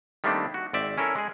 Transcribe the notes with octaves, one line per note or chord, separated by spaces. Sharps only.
D#3 G3 A3 A#3 C4 D4
F#4
G#1 C4 D5 E5
C#4 E4 A4 A#4
G#3 G#4